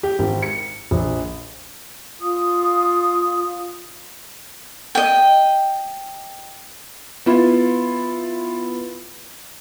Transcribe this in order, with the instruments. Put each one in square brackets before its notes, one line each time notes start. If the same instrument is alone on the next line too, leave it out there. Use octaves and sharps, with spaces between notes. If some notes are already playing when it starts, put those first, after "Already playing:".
[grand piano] G4
G#1
C#7
A#1
[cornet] F4 [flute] D#6
[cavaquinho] D#5 G5
[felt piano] B3 E4 F4